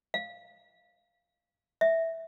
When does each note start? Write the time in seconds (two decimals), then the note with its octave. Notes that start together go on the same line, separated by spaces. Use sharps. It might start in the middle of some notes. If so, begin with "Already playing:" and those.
0.14 F5
1.81 E5